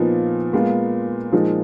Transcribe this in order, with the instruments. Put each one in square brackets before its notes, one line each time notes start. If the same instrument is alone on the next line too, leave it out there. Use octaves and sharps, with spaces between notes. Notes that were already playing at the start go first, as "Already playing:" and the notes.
Already playing: [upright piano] A#2 F3 B3 D#4
A#2 G#3 B3 F4
A#2 F3 G#3 D#4